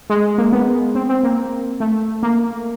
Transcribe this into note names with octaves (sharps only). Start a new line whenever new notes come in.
G#3
A#3
B3
C4
C4
A#3
A3
A#3